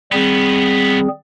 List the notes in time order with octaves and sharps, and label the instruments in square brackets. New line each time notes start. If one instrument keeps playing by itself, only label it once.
[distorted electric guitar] D#3 B3 [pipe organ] G3 C4 G#4